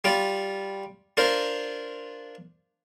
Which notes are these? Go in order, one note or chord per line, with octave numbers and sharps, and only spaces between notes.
G3 F4 D5
D4 F4 A#4 C5